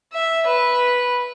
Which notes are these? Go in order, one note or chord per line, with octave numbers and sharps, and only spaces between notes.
E5
B4